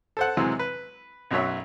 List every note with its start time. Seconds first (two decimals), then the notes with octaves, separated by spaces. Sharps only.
0.17 A4 C5 F#5
0.37 C3 E3 F#3 G#3 C4
0.59 B4
1.31 B1 F#2 F#3 C#5 E5